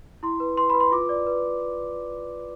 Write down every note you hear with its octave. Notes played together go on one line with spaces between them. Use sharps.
E4 C6
B4
B4 C6
B4 B5
C6
F4 D6
D5
B4